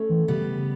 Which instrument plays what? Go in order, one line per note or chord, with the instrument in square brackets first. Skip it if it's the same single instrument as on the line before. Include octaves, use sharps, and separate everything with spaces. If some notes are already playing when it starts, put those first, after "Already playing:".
Already playing: [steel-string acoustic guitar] A3 C#4
[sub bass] E3
[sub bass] C#3 [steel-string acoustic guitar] G3 B3